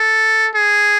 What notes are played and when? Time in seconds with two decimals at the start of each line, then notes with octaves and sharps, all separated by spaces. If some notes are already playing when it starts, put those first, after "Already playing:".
Already playing: A4
0.55 G#4